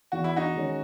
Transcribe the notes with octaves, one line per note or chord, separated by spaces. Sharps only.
E2 F#4
E4
D#4 F#4
D#3 G#3 C#4